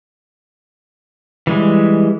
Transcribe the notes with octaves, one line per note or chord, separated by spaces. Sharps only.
E3 G3 G#3